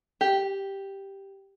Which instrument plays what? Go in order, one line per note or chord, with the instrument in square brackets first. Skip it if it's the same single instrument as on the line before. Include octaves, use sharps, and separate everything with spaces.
[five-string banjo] G4